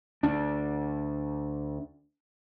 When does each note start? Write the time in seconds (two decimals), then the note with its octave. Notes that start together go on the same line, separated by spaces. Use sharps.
0.23 D2 D4